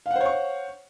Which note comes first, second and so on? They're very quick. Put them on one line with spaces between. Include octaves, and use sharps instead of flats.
F5 F#5 C5 C#5 C#6